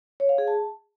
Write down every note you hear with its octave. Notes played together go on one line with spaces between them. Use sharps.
C#5
F5
G#4
A5